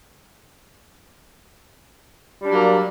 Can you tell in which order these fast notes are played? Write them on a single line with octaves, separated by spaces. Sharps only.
G3 D4 F#3 A#3